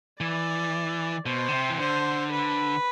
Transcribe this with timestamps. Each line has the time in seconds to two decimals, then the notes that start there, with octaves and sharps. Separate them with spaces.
0.21 E3 D5
1.26 B2 C5
1.48 D3
1.53 C3
1.70 E3
1.79 D3 C5
2.31 B4